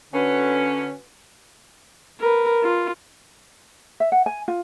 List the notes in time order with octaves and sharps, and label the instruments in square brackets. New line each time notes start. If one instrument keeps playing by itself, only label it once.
[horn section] D3 C#4 [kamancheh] F#4 B4
[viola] A#4 B4
F4
[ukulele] E5
F#5
G#5
F4